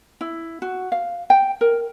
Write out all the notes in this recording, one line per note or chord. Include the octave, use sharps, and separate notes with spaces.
E4
F#4
F5
G5
A#4